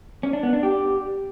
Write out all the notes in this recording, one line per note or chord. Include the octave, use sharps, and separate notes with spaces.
C#4
D4
B3
D4
G4